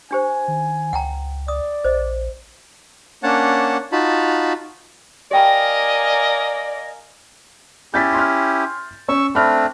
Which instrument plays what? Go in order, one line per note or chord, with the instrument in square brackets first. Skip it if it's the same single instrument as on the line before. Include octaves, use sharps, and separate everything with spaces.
[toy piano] D4 G4 C5 [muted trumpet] G#5
[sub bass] D#3
[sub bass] C#2 [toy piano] F#5 G5 A#5
[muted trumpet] D5 [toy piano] D#6
[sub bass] A#1 [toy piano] C5 D#5
[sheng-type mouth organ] A#3 C#4 D4 C#5 F#5 A5
D#4 F4 F#4 A5 B5
[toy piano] G4 G5 B5 [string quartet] A#4 F5 G#5 [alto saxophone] D5 [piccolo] D#5
[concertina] C#4 E4 G4 [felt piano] G6 A6 B6
[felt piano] C6 F6
[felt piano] C#4 [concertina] C#6 E6
[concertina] A3 C4 D4 [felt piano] B5 F6